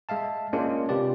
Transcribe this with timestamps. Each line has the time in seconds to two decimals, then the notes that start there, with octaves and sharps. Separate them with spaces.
0.09 G#3 E5 F5 A5
0.53 G#3 A#3 C#4 D4 F4
0.89 C3 F4 G4 B4 D5